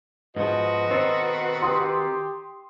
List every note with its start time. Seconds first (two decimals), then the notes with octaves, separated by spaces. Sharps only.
0.37 G#2 F3 F#4 B4 D#5
0.91 D#3 C4 A4 C5
1.62 G4 C6 D#6